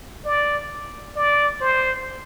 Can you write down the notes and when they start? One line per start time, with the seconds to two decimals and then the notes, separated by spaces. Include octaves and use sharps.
0.25 D5
1.16 D5
1.61 C5